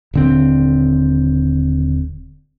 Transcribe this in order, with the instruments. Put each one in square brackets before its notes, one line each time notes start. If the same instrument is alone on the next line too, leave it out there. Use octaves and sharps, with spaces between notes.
[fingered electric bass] D#1 D3 C4